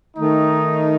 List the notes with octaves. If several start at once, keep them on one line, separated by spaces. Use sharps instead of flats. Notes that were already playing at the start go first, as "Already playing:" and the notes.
D#3 A3 D#4